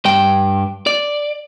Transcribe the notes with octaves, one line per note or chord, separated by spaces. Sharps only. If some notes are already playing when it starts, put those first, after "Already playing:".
G2 G5
D5